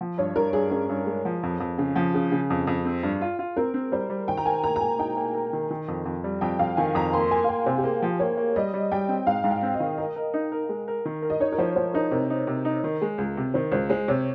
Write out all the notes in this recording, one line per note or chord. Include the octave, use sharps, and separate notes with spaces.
F3
G2 C#5
G2 A#4
G2 G#4
C#4 G#4
G2
G#3
F3
F2
F2
C#3
F3
C#3 G#4
C#3
F2
F2
C4
G2
F4
F4
C4 A#4
C4
G3 C5
G3
D#3 G5
A#5
A#4 G#5
A#3 A#5
A#5
A#3 G#5
D#4 G5
A#3
A#4
D#3
D#3
F2
F2
G3
F2 G5
F2 F5
D#3 G#5
F2 A#5
A#3 C6
A#3 G#5
F5
A#3 G5
C3 C5
G4
A#3 G#4
F3
A#3 C#5
A#3
G3 D#5
G3
G3 G5
C4
G#2 F5
G#2
G5
C4
D#5
D#3
A#4 D#5
A#4
D#4
A#4
G#3
A#4
D#3
A#4
D#5
D#4 C#5
A#4
F3 C5
F3 C5
D#4 A#4
C3 A#4
D#4
C3
D#4
D#3
G#3
C#2
C3
D#3 C5
C#2 C5
G#3 C5
C3 C#5